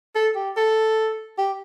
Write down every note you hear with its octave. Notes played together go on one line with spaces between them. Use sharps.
A4
G4
A4
G4